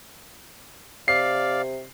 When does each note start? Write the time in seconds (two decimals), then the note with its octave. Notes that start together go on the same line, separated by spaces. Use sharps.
1.08 C3 D5 F5 C7